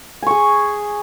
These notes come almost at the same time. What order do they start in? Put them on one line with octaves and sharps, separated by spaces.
G#5 C#6 G#4